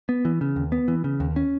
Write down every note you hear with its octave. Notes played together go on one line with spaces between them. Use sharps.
B3
E3
C#3
D#2
B3
E3
C#3
D#2
C#4